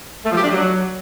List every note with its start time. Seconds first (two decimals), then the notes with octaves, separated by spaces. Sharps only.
0.24 A3
0.31 F3
0.37 G4
0.44 D4
0.51 F#3